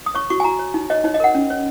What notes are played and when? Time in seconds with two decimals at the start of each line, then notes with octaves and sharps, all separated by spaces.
0.06 D#6
0.15 C#5 C#6
0.30 F#4 C#6
0.40 G#5
0.44 F#4 A#5
0.59 C#5
0.74 D#4
0.90 C#5 D#5
1.04 D#4 C#5
1.14 D#5
1.20 A#4 F#5
1.35 C#4
1.50 C#5